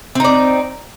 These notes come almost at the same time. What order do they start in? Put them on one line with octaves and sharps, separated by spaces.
C4 D#4 D5